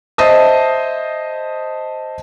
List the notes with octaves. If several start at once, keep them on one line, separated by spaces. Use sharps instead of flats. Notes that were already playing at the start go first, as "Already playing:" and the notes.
C5 D#5 E5 A5 D#6